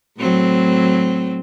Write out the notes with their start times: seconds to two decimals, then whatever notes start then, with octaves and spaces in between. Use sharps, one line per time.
0.18 A2 F#3 C4